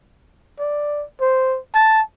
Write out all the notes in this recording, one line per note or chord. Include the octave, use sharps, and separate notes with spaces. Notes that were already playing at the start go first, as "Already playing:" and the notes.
D5
C5
A5